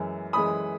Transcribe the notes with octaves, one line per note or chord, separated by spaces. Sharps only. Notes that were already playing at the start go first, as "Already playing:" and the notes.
Already playing: F#2 E3 G#3
F#2 E3 G#3 B5 D#6